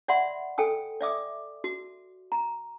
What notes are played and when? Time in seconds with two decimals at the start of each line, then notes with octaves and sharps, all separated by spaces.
0.08 D5 E5 F#5 B5 C6
0.58 A4 G5 G#5 D#6
1.01 D5 E5 D6 D#6
1.64 F#4
2.32 A#5